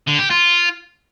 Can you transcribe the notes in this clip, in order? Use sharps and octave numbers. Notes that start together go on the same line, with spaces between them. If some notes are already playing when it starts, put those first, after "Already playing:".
D3
G4
F4